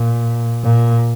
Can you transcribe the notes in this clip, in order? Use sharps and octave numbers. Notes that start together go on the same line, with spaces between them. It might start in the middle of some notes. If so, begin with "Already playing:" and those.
Already playing: A#2
A#2